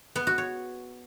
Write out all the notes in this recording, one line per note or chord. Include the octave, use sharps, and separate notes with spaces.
B3
F#4
C#5